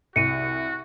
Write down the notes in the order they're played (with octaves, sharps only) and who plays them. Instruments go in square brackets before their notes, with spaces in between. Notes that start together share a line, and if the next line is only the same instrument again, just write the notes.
[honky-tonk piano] C2 [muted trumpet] F#4 [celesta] C#7 D#7